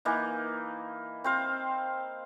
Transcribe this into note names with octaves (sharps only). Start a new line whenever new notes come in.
E3 A#3 D#4
C4 C5 F5